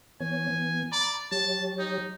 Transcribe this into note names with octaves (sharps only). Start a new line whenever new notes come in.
E3 B3 C#5 G#5
E3 B3
D5 A#5 B5
F#3 G4 C#5 A5
D#4